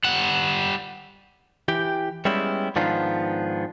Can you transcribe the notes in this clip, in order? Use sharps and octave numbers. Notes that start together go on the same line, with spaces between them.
G3 F#5
E3 G4 G5
G3 G#3 B3 C#4 E4 G4
G#2 D#3 F3 B3 D4 F4